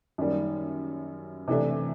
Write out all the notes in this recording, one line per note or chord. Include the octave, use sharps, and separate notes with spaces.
F#2 D#3 G3 A#3
C3 E3 A3 D4